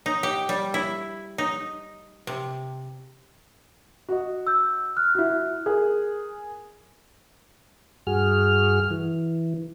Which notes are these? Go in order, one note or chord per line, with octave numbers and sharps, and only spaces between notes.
D#4
G4
G3
E4
D#4
C3
F#4 D#5
E6 G6
F6 F#6
E4 F#4
G#4 A#4
G2 F#4 G#4 F6
E3